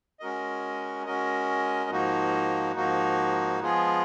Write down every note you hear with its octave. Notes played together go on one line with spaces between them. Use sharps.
G#3 C#4 F#4 A#4 D#5
G#3 C#4 F#4 A#4 D#5
G#2 F3 A#3 D#4 F#4
G#2 F3 A#3 D#4 F#4
F3 G#3 B3 F4 G#4